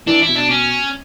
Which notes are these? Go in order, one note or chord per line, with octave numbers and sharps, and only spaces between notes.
E3 D4
E4
B2
D4
C#4